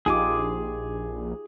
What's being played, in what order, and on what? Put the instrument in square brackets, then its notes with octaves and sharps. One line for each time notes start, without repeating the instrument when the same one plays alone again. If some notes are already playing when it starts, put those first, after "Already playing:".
[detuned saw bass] A#1 [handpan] D#4 F4 G4 [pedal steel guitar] G#4 G#5 D6